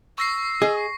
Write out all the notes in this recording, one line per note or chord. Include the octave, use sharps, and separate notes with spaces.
C#6 E6 A#6 C7
G#4 D#5